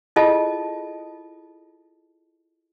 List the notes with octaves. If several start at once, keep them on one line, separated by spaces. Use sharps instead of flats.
E4 F4 G#4 A4 D#5 A5